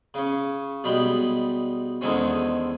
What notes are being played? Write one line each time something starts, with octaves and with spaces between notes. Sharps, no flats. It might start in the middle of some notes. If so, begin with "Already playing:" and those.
C#3 C#4
B1 G3 G#3 G5 B5
E2 D3 D#3 G#3 C4 C#4